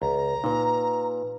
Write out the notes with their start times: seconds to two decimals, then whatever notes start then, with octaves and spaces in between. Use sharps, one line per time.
0.02 C#2 A#5
0.44 A#2 D#4 B4